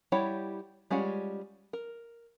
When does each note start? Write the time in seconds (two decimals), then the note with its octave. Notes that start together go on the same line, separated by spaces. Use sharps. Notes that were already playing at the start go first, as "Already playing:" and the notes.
0.12 G3 E4 G4 C#5 F#5
0.90 G3 G#3 C#4 F4 F#5
1.73 A#4